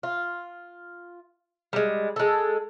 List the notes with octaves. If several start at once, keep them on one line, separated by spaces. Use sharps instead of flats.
F4
G3 G#3
G#3 A4